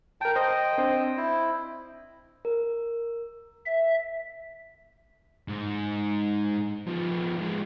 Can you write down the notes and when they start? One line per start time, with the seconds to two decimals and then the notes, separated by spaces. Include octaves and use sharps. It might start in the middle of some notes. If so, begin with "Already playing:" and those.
0.21 A#4 G5 A5
0.35 C5 D#5 G5
0.78 C4 D4 C5
1.17 E4
2.45 A#4
3.66 E5
5.48 G#2
6.88 F3 B3
7.38 F3 G#3